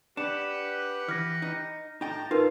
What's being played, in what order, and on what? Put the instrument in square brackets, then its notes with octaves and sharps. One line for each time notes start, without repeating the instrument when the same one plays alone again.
[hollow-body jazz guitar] D4 [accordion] G4 B4 F#5 [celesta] E7
[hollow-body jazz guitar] E3 [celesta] F6 A#6
[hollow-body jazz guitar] D#4
[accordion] A2 A5 A#5 [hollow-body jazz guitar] D#4 G5
[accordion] G#2 D3 [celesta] D#4 A#4 B4 [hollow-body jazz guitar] F4